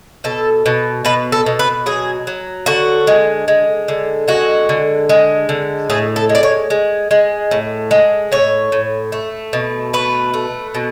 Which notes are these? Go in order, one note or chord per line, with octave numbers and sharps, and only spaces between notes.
B2 A4
B2
B2 B4
A4
B2
B4
F#3 G#4
F#3
D3 F#4
G#3
G#3
D3
G#3 F#4
D3
G#3
D3
A2 G#4
A4
G#3
D5
C#5
G#3
G#3
A2
G#3
A2 C#5
A2
A3
B2
A3 B4
A3
B2